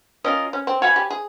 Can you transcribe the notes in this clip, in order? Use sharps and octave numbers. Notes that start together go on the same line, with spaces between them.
C#4 F4 A#4 D#5
C#4
C4
F#4 C#5 F5 G#5 B5
G4
G#4